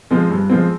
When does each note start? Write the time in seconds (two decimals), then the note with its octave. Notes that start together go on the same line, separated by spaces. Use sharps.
0.11 F3 G#3 C4
0.30 G2
0.49 F3 G#3 C4